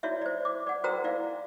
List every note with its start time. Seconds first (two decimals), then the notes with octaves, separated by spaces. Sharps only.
0.03 E4 F#4 C#5 D5 E5
0.21 C5 D5
0.45 D6
0.67 D5 F#5
0.84 F#4 A#4 C5 G5 A#5 E6
1.04 E4 D5 F5